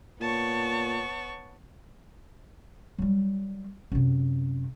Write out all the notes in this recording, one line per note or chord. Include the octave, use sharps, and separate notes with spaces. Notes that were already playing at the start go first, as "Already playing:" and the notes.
A#2 B3 C#5 A5 C#6
F#3 G3
F#2 C3